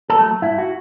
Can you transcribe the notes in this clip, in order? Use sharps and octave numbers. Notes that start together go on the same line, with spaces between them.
A4
F#3 A3
G2 E4
F#4